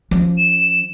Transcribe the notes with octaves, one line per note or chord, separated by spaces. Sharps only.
F3 C#4
E7